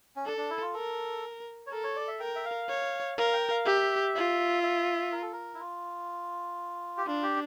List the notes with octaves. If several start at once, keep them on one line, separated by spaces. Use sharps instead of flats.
C#4
D4 A4
D4
E4
F4
A4 A#4
C#5
A4 A#4
C#5
D5
E5
A#4 G5
E5
F5
C#5
A#4 F5
G5
F5
G4 E5
F4
E5
A#4
A4
A#4
E4
F4
G4
D4 F4
G4